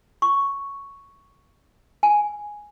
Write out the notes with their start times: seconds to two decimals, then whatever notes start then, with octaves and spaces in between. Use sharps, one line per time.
0.22 C#6
2.03 G#5